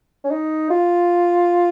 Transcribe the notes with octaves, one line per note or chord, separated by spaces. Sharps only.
C#4
D#4
F4